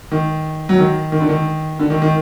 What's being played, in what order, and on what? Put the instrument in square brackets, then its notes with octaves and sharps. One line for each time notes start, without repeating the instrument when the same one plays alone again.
[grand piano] D#3
F#3
D#3
D#3
D3
D#3
D3
D#3
D#3